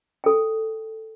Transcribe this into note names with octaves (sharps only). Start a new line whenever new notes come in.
A4 G5